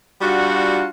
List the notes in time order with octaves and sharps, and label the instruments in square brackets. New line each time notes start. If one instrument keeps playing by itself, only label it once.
[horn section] G3 D4 F4 F#4